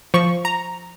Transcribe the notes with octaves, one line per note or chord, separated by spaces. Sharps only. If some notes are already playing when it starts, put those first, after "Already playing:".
F3 C#6
A#5